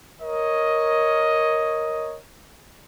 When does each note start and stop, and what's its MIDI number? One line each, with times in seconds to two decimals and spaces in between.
0.20 2.17 70
0.20 2.17 73
0.20 2.17 75